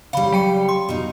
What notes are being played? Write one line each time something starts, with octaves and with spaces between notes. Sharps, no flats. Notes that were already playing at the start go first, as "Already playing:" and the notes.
C#3 G3 F5 B5
F#3 G5 C#7
C6
B2 D#4